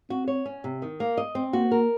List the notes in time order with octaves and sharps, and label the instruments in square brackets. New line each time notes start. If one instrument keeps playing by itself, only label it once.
[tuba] C4 [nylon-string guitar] F#4
[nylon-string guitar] C#5
C#4
C3
D#3
A#3
D#5
C4
[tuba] A#3 [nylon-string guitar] F#4
[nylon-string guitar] A#4